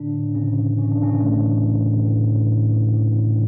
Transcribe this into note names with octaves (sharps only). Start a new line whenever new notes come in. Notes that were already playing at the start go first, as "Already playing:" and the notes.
Already playing: A2 D3 D4
A2
A2 C#3 C#4
E3
E3 C#4
D4
A2 C#3 C#4
A2 A3
E3
E3
A2
A2
E3
A2
E3
E3
A2